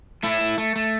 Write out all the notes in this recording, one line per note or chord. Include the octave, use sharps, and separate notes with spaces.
A3 E4
A3
A3
A3